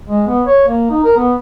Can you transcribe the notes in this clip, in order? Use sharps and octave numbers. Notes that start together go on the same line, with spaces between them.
G#3
B3
C#5
A#3
D#4
A#4
B3